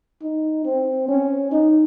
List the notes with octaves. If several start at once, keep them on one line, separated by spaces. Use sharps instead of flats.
D#4
C4
C#4
D#4